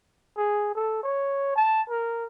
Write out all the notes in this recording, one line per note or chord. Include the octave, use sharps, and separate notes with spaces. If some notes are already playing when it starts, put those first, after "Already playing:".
G#4
A4
C#5
A5
A#4